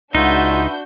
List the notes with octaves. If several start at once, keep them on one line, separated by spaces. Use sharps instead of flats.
C#2 D4 D#4 F4 F#4 B4 E5 G6